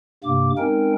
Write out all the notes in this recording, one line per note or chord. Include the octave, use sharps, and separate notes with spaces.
G2 C3 A#3 D6
G#3 C4 C#4 D#4 A#4 G5